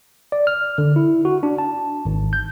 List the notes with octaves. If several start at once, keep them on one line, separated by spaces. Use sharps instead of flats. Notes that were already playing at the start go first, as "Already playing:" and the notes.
D5
F6
D3
E4
F#4
D4
A5
G#1
G6